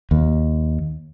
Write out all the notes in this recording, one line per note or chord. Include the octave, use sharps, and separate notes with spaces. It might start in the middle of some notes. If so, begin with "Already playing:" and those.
D#2